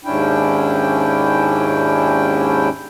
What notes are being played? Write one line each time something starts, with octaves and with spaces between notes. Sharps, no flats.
D#2 G#2 C#4 D4 E4 G5